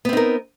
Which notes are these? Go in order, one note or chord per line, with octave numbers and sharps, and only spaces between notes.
B3 C4 D#4 A#4